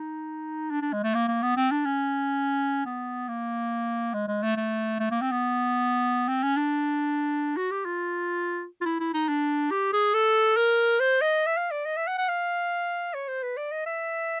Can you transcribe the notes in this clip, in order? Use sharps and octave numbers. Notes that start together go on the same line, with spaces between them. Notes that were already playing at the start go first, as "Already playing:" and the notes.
Already playing: D#4
D4
D4
G#3
A3
A#3
A#3
B3
C4
D4
C#4
B3
A#3
G#3
G#3
A3
A3
A3
A#3
C4
B3
C4
C#4
D4
F#4
G4
F4
F4
E4
E4
D#4
D4
G4
G#4
A4
A#4
C5
D#5
E5
F5
D5
D#5
E5
F#5
F#5
F5
C#5
C5
B4
D5
D#5
E5